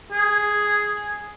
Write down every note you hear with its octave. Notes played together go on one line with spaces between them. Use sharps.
G#4